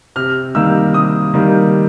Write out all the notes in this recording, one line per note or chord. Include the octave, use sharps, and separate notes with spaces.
C3 F6
D#3 G3 A#3 E6
C3 D#6
D#3 G3 A#3